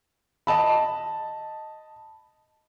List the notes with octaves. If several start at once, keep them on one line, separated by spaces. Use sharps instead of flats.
D#5 A5 B5